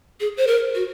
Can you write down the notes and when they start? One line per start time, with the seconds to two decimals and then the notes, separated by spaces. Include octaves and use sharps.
0.20 G#4
0.37 C5
0.47 A#4
0.74 F#4